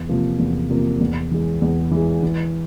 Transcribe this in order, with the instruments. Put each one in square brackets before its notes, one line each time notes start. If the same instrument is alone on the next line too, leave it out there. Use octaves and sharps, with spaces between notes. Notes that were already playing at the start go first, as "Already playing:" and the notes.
Already playing: [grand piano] E2
C3 F3 A#3
E2
C3 F3 A#3
E2
E3 G#3
E2
E3
G#3
E3